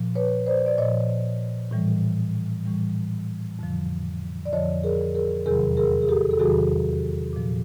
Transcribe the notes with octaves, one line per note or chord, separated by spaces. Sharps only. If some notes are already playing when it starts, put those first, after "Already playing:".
Already playing: A#2 F3
B4 C#5
C5 D5
D5
A#2 F3 C#5 D#5
A2 E3 G3
A2 E3 G3
F2 D3 F3
D5
F2 D3 F3 C#5 D#5
G#4 A#4
G#4 A#4
E2 C3 D#3 F#3 G#4 A#4
G#4 A#4
G#4
G4 A4
A4
E2 C3 D#3 F#3 F#4 G#4
A#2 F3